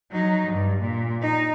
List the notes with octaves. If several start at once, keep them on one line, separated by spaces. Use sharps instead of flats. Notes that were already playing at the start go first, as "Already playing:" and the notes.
F#3 D#4
G2
A#2
D#4